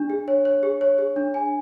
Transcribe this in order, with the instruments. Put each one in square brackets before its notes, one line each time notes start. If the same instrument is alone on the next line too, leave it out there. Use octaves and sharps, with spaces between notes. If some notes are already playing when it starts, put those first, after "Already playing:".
Already playing: [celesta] D4
G#4
C#5
C#5
G#4
C#5
G#4
D4
G#5